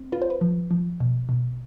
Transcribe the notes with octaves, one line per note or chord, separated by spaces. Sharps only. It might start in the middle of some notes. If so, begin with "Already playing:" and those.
Already playing: C4
F4 B4
C5
B4
F3
F3
B2
B2